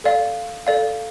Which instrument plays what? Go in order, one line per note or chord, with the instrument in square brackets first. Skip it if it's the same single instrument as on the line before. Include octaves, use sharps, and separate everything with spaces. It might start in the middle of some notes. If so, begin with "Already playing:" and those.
[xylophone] A4 D5 F5
A4 D5 F5